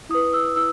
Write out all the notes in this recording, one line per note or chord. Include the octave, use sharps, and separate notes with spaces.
E4 B4 D#6
E6
E4 E6